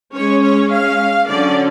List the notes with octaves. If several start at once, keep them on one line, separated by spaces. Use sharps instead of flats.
G#3 C#4 C#5
C#5
F5
D3 F#3 C#4 D5